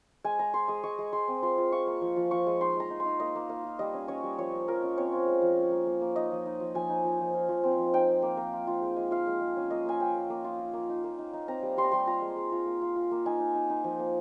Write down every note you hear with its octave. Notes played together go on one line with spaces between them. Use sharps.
G#3 G#5
G#3 A#5
G#3 C6
G#3 D#6
G#3 C#6
G#3
G#3 C6
C4
F4 C6
F4
F4 C#6
A#3
F3
F3
F3 C#6
G#3
D#4 C6
G#3 A#5
D#4
C6
D#4
A#3 D#5
A#3
A#3 F5
F4
G3 D#5
C#4
C#4 C#5
G3
F3 C#5
C#4
F3 A#4
C#4
C4 C#5
F4
G#3
F3
C#4
A#3
A#3
A#3
D#4 D#5
F3
D#4
F3
F3 G#5
D#4
F3
F3
F4
F3
C4
F3
D#4 G5
A#3
A#3
A#3
F4
F4
G#3
G#3
F4 F5
G#3
G#3
C#4
A#3 D#5
A#3 G#5
C#4 G5
A#3
A#3
F4
F4
A#3
D#4
A#3
D#4
D#4
C4 A#5
G3
G3 C6
A#5
G3 C6
F4 A#5
G#3
G#3
F4
A#3
F4
F4
A#3
D#4 G#5
D#4
D#4
D#4
F3
A#3